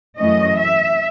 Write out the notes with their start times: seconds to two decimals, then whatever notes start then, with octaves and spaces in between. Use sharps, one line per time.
0.18 F#2 E3 A3 C#4 D#5
0.57 E5